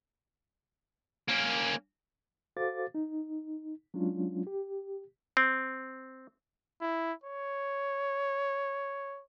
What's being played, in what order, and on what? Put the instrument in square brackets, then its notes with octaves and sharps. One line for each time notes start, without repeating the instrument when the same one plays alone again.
[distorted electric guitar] A#3 C#4
[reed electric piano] F#4 A4 C5 F5 D6 A6
D#4
F#3 G#3 C#4 D4 F4
G4
[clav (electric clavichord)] C4
[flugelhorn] E4
C#5